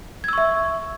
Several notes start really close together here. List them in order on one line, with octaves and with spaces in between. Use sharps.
G#6 E6 C#6 E5